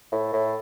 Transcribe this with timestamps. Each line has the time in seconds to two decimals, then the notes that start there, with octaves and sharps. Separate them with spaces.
0.12 A2
0.33 A2